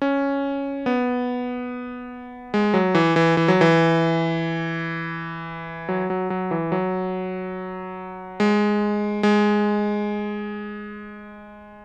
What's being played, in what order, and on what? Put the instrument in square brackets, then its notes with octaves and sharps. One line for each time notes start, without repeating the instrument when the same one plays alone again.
[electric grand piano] C#4
B3
G#3
F#3
E3
E3
E3
F#3
E3
F#3
F#3
F#3
E3
F#3
G#3
G#3